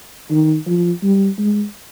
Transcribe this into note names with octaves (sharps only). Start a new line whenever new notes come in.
D#3
F3
G3
G#3